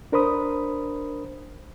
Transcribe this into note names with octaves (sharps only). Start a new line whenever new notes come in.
D4 A#4 C5 B5 D#6